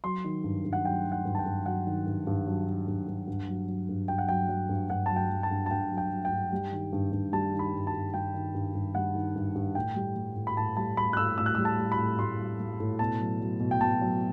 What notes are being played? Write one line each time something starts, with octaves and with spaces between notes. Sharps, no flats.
F#3 C6
D#3
G2
G2
F#5
F#3 G5
D#3
F#5
G2
A5
G5
G2
F#3 F#5
D#3
G2
G2
F#3
D#3
G2
G2
G2
F#3
F#3
G2
G2 G5
F#5
F#3 G5
F#3
G2
G2 F#5
F#3 A5
G5
F#3
A5
G2
A5
G2 G5
F#3
G5
F#3
G5
G2
G3
D#3
G2
G2
G3 A5
D#3
B5
G2
A5
G2
G3 G5
D#3
G2
G2
G3 F#5
D#3
G2
G2
A2 G5
G3
G3
A2
B5
A2 A5
G3 A5
G3 B5
F#6
A2 E6
A2 E6
F#6
E6
G3
A5
G3
B5
A2
A2 C6
G3
G3
A2
B2 A5
F#3
F#3
B2
G5
B2 A5
F#3